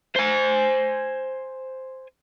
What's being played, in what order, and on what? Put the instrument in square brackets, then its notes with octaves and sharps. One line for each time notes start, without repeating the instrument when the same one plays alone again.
[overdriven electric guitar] C5 G#5